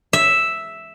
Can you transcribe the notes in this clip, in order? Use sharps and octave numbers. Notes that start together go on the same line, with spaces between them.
E5